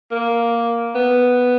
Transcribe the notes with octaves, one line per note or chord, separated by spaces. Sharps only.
A#3
B3